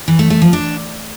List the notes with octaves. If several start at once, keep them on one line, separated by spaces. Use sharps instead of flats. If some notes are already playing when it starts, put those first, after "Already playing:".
E3
A3
A3
F3
D4